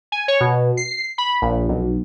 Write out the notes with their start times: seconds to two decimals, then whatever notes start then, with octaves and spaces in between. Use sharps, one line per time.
0.12 G#5
0.28 C#5
0.41 B2
0.77 C7
1.18 B5
1.42 A#1
1.69 B1